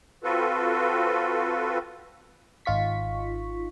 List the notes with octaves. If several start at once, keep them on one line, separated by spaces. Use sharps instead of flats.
C4 F4 F#4 A4 B4
G#1 D#4 F4 C#6 B6